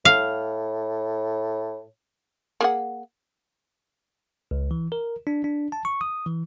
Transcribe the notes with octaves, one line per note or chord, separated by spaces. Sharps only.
A2 F5
A#3 G#4 F#5
C#2
E3
A#4
D4
D4
A5
C#6
D#6
E3